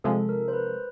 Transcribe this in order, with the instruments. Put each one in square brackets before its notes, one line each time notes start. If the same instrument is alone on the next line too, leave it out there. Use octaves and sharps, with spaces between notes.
[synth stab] C3 F3 G#3 [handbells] A4
[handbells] A#4
C5
B4